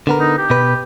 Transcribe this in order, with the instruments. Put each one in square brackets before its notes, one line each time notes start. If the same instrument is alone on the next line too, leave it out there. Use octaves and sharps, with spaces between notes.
[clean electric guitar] D3 B3 A#4
[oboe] D#4
G4
[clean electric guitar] B2 B4